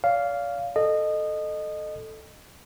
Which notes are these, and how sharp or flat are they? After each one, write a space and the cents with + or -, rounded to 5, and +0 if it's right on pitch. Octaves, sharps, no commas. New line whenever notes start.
D5 -45 F5 +0
A4 +0 D#5 -20